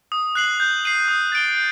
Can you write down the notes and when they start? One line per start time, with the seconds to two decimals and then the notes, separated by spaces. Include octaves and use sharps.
0.12 D#6
0.35 F#6 C7 F#7
0.60 G6
0.85 C7 D#7 F#7
1.08 D#6
1.32 A6 D7 G7
1.56 G6